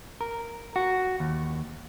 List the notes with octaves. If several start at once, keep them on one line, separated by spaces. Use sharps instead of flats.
A#4
F#4
D#2